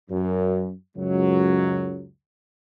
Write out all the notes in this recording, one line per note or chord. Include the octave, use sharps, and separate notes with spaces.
F#2
C#2 F#2 F#3